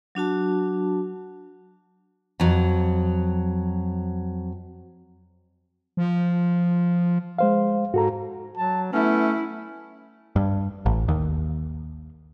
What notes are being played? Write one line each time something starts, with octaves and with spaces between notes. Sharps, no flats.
F#3 D4 F#4 A5
F2 F#3
F3
G#3 C5 F5
G#2 F#4 A4 A#5
F#3 A5
A3 B3 C#4 E4
G2
A1
D#2